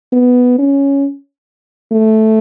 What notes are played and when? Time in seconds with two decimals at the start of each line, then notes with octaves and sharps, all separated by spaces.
0.13 B3
0.59 C#4
1.92 A3